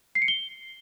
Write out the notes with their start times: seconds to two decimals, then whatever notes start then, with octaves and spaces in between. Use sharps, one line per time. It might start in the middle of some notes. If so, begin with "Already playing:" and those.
0.15 C7
0.22 C#7
0.28 G7